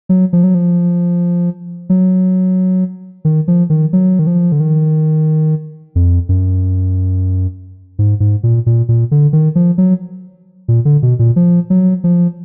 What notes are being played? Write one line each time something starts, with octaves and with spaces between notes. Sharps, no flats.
F#3
F3
F#3
F3
F#3
D#3
F3
D#3
F#3
D#3
F3
D3
D#3
F2
F#2
G#2
G#2
A#2
A#2
A#2
D3
D#3
F3
F#3
A#2
D3
B2
A#2
F3
F#3
F3